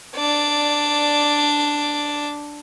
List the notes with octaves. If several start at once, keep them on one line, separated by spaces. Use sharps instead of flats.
D4 D5